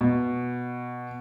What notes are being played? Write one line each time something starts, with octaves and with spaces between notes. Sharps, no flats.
B2